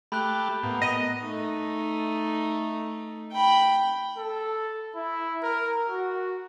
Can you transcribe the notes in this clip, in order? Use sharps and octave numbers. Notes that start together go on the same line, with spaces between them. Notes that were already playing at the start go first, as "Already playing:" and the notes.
A3 G4 B5 F#6
A2 A#3 B3
A#4 D#5 D#6 D#7
A3 D#4
G5 B5
A4
E4
A#4
F#4